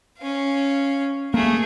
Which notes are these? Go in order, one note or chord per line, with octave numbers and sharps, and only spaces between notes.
C#4 F5
A3 A#3 G#4